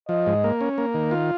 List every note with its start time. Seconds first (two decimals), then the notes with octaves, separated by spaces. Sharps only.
0.09 F3 D#5
0.26 G#2
0.44 A#3
0.61 C#4
0.78 A#3
0.94 D#3
1.11 F4